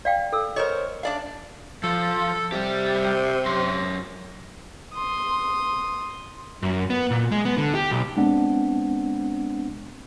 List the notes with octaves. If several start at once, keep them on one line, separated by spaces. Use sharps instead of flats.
D5 F5 G5
A4 E6
A#4 C5 C#5 D#5
D4 D5 F5
F3 A4
C3 G3 G4
F#2 C6
C6 D#6
F#2
B3
A#2
G#3
B3
D3
G4
B1
G#3 B3 C4 D4 F#5